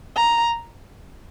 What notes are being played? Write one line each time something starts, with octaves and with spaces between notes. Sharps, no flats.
A#5